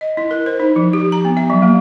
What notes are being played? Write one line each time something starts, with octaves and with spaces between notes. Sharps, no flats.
D#5
E4
A#4
C5
D#4
F3
G4
A#5
B3
E5
F#3
A#3